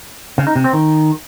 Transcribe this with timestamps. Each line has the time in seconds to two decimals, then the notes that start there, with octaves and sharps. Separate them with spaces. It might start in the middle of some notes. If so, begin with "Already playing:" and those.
0.38 C#3
0.47 D#4
0.56 C3
0.64 C4
0.73 D#3